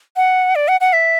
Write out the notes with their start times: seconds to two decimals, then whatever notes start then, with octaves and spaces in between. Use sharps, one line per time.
0.16 F#5
0.55 D5
0.68 F#5
0.81 F#5
0.93 E5